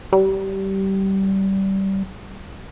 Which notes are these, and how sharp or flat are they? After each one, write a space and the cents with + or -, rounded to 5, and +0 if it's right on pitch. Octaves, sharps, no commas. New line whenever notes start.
G3 -20